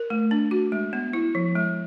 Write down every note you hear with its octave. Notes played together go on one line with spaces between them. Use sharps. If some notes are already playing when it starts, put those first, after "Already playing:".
Already playing: A#4
A3
D4
F#4
G#3
B3
E4
F3
G#3